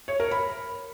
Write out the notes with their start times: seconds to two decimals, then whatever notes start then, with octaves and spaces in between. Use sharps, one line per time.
0.08 C#5
0.20 A#4
0.31 B5